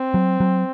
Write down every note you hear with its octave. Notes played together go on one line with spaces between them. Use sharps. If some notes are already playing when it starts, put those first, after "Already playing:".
Already playing: C4
F#3
F#3